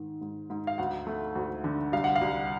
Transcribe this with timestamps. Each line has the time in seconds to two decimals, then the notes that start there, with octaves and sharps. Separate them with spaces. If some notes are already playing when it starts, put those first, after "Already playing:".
Already playing: G#2 D#3
0.21 G#2
0.50 G#2
0.67 F5
0.78 D2 F#5
1.07 A3
1.35 D2
1.64 D3
1.92 C2 F5
2.04 F#5
2.16 F5
2.21 C2